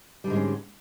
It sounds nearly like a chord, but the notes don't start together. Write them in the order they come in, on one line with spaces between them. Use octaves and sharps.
G3 D3 G#2 G#3 C#4